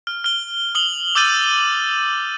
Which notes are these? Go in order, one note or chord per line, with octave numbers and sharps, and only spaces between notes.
F6
F6 G7
D#6 F#7 G7
D6 E6 G6 A6 D#7 F#7